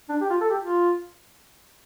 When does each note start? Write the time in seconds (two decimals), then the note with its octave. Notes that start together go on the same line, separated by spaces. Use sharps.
0.09 D4
0.21 G4
0.30 F4
0.41 A4
0.50 G4
0.62 F4